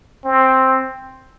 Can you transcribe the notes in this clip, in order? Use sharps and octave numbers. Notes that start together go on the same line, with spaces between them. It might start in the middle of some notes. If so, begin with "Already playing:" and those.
C4